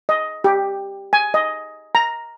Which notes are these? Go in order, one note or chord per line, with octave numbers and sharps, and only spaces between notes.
D#5
G4
G#5
D#5
A#5